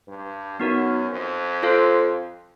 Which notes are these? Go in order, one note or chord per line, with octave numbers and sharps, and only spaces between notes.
G2
F#2 B3 D#4 F#4 A#4
F2
F4 A4 C5 F5